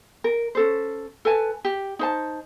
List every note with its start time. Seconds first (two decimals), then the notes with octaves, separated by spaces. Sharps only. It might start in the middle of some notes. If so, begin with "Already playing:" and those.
0.24 A#4
0.55 C#4 A4 C5
1.25 A4 B4 G#5 A5
1.65 G4
1.99 D#4 C5 A5